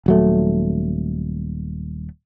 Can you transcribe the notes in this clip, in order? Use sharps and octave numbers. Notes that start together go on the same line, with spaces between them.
D#1 F#3 A3